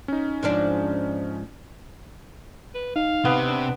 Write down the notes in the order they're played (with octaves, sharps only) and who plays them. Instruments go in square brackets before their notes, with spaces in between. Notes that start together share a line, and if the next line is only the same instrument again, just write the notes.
[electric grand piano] C#4 D#4
[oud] G#2 F3 D4
[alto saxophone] B4
[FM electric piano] D#4 [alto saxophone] F5
[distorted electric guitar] C3 [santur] B3
[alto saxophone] D4